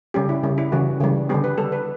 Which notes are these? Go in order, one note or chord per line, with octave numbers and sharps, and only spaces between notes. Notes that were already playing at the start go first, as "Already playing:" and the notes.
C#3 G3 C#4 G4
E4
C#3 G3 C#4
E4
C#3 E3 G3 F#4
C#3 E3 G3
D3 G3 B3 G4
B4
D3 G3 B3 A4
B4